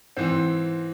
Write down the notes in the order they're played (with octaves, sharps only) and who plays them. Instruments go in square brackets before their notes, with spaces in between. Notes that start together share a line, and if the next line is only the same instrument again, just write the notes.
[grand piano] G#2 E3 C4